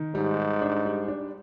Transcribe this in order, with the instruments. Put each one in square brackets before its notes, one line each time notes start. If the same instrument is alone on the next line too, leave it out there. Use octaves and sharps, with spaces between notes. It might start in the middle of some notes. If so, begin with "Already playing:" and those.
Already playing: [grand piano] D#3
[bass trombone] G#2 [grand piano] G3
[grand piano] G3
D4
G3
D4